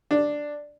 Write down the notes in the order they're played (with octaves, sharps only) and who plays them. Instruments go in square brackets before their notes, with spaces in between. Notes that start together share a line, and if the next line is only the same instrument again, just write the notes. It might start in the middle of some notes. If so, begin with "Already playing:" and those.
[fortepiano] D4